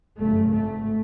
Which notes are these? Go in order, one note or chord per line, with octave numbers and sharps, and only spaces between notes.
G1 F#2 C#3 A3
G#1 G#2 A3